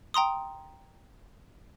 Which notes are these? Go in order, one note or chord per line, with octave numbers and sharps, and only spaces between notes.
G5 A#5 C6 D#6